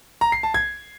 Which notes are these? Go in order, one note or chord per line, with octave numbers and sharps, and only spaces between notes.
A#5
C7
A5
G#6